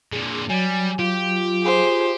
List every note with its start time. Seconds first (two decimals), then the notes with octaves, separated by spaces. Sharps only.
0.12 A#2 D3 G#4
0.49 F#3 G3 G#5
0.99 F4 G4
1.63 G#4 C5